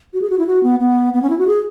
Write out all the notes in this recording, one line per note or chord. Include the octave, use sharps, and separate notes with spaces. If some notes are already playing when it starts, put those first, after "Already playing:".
F#4
G#4
F#4
E4
F#4
B3
B3
B3
C#4
E4
F#4
G#4